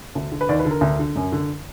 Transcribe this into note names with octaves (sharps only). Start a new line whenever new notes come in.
D2
D3
B4
D#2 D5
B4
D3
A#4
D2
D3
F#2
D3